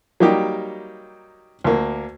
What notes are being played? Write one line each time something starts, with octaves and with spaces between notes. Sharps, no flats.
F#3 G3 A#3 D#4 G4
D2 A#3